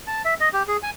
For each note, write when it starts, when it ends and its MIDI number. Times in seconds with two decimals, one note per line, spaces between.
0.07 0.22 81
0.25 0.34 76
0.40 0.49 75
0.53 0.63 67
0.68 0.77 68
0.83 0.91 80